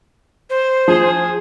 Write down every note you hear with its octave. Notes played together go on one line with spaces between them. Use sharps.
C5
F3 G#4